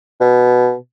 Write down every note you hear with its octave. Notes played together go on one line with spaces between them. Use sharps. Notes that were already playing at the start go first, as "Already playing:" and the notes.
B2